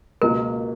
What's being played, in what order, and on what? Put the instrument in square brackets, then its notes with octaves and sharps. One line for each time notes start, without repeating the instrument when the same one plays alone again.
[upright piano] C#2 B2 A#3 F4 [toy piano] A#4